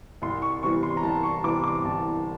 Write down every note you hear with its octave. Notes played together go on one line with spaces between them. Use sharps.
C2 C6
C#6
C3 E3 G3 B3 C#6
C6
A#5
C2 A5
C#6
C3 E3 G3 B3 D6
D6
C2 A5